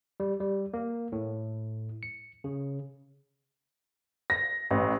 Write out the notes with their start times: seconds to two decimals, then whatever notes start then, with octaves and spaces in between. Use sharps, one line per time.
0.20 G3
0.40 G3
0.74 A#3
1.12 A2
2.03 C#7
2.44 C#3
4.30 A#6
4.71 A1